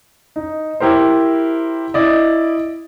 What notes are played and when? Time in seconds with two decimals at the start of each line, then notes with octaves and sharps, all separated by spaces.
0.36 D#4
0.80 E4 G4 A#4 C5
1.94 E4 D5 D#5